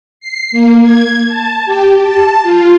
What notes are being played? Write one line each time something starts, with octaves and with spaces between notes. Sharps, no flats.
C7
A#3
G#6
A5
G4
A5
F4